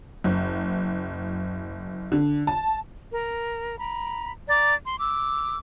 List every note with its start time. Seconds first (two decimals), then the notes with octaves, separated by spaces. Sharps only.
0.24 F#1
2.12 D3
2.47 A5
3.11 A#4
3.78 A#5 B5
4.48 D5 A#5 D6
4.86 C6
4.99 D6 E6